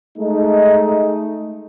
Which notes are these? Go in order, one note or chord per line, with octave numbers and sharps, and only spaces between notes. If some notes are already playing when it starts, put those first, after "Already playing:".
G#3 A3 D#4